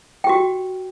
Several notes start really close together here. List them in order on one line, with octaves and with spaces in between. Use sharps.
G5 G4 F#4